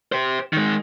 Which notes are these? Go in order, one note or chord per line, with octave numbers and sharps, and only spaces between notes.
G4 C5
D#3 G#3